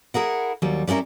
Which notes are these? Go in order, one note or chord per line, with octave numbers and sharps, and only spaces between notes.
E4 G#4 A#4 F#5
D#2 F#3 G3
G3 B3 C#4 E4 A#4